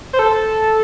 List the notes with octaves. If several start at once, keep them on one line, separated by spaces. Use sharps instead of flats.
C5
A4